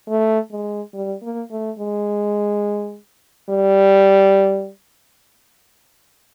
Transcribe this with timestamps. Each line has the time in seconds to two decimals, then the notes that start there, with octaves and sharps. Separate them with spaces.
0.09 A3
0.52 G#3
0.94 G3
1.23 A#3
1.51 A3
1.79 G#3
3.49 G3